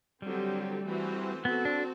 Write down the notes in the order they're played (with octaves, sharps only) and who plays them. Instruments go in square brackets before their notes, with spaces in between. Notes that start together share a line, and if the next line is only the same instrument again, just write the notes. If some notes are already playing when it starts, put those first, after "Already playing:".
[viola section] D3 F#3 C4 G4 [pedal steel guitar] G3
[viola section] E3 A3 C4 F#4 C5
[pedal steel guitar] B3 [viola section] C4 F#4 A4
[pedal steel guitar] D4